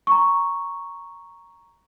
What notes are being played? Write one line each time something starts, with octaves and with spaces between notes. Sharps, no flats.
A#5 C#6